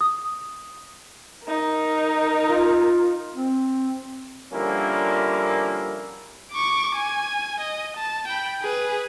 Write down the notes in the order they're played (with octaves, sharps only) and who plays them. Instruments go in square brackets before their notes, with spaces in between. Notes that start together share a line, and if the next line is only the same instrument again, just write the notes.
[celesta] D#6
[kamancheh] D#4 A#4
[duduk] F4
C4
[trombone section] D3 F3 G3 A#3 C#4 E4
[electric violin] C#6 D6
G#5
D#5
A5
G5 B5
G#4 B4